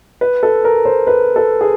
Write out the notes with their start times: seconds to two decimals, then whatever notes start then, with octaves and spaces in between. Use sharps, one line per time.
0.21 B4
0.43 A4
0.64 A#4
0.85 C5
1.07 B4
1.36 A4
1.61 G#4